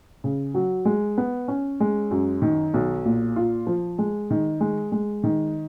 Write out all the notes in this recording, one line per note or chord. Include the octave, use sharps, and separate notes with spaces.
C#3
F#3
G#3
B3
C#4
G#3
F#2
D#3
B1
A#2
F4
F3
G#3
D#3
G#3
G#3
D#3